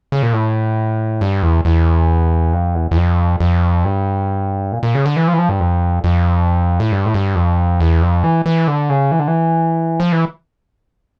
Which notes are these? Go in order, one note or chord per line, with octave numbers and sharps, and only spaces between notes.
C#3
A#2
A2
G2
E2
E2
F2
E2
E2
F2
F2
G2
A#2
A#2
C#3
D3
E3
F3
E3
F3
G2
F2
F2
A2
G2
A2
G2
F2
E2
F2
E3
E3
D3
C#3
E3
D3
E3
F3
E3